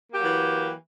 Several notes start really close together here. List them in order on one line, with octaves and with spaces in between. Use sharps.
A#3 G4 F#3 E3